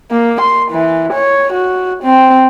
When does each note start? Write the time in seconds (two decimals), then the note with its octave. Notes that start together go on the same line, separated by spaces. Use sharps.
0.11 A#3
0.41 C6
0.71 E3
1.14 C#5
1.53 F#4
2.03 C4